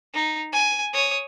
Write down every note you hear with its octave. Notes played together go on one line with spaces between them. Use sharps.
D#4
G#5
C#5 D#6